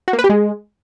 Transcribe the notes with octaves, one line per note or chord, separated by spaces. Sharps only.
F#4
A#3
B4
G4
G#3